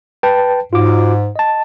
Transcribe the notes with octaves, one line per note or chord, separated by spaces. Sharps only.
B4 G5 A5
G#2 F4 F#4 D6
D#5 A5